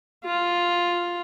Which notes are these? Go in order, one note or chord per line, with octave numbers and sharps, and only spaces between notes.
F4